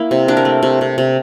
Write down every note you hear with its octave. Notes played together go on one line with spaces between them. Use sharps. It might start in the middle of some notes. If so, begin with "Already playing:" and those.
Already playing: A#3 E4
C3
A#3 D4
A#4
A3
C3
C3
C3